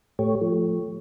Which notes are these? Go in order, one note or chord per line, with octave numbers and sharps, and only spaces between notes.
A2 A3 G4 C#5
F3 A3